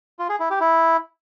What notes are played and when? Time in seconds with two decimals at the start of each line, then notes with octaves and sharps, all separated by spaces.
0.19 F4
0.29 G#4
0.40 E4
0.50 G4
0.61 E4